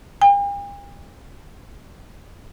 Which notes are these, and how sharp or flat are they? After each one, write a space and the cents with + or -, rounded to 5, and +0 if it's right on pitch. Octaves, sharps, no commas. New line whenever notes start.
G5 +45